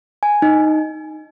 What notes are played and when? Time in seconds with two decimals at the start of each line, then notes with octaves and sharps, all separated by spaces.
0.23 G#5
0.42 D#4